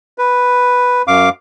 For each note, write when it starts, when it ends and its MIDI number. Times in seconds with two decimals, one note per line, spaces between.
0.18 1.02 71
1.08 1.29 42
1.08 1.29 77
1.08 1.29 86